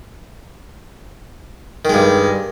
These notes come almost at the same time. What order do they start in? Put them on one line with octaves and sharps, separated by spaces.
D#3 G#3 G2